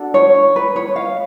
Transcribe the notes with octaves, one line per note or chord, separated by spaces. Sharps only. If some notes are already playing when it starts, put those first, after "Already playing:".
Already playing: D4 F#4 A4
C#5
B4
C#5
F5